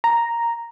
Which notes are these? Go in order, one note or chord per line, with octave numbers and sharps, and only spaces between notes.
A#5